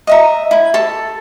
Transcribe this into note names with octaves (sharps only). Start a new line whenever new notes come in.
D#5 E5 A#5
E4
A4 A5